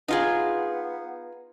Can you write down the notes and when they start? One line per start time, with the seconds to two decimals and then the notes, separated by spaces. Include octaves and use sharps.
0.08 B3 D#4 F4 G#4